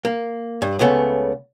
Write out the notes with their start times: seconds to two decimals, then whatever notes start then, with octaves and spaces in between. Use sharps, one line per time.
0.05 A#3
0.62 G2
0.79 C#2 C#3 A3 B3